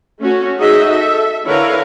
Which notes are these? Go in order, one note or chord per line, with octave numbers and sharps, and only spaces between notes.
A3 C#4 F#4
D#4 F#4 G#4 D#5 E5
A4 E5
D3 E4 A#4 B4 C#5 F5